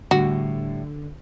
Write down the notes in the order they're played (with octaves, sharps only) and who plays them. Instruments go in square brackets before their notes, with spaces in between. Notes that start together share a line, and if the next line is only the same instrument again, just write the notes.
[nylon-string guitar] A2 G3 [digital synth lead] D3 [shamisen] F#4